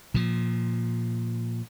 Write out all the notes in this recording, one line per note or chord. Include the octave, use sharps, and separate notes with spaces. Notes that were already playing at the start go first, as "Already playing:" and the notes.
A#2 F3